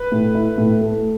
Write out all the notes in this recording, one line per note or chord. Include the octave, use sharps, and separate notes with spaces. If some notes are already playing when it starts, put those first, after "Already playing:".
Already playing: B4
A2
E4
A2
A3